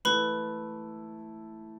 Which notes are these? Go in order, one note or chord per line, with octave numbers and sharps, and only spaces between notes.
E3 A3 E4 A4 B4 B5